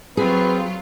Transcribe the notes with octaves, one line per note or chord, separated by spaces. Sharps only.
F#3 C4 F4 G#4 B4